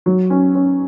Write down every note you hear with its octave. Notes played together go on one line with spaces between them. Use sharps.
F#3
C#4
C#4